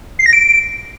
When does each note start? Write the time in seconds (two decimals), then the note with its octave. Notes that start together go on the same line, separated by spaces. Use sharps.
0.19 C7
0.26 A#6
0.33 D7